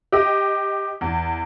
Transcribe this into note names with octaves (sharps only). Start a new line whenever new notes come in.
G4 D#5
E2